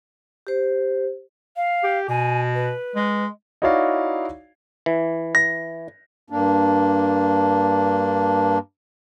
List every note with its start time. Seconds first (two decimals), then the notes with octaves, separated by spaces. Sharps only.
0.47 G4 C5
1.56 F5
1.83 G4
2.09 B2 G#5
2.54 B4
2.95 G#3
3.62 D#4 E4 F#4 C#5 D5 F5
4.86 E3
5.35 A#6
6.30 G2 A#3 D4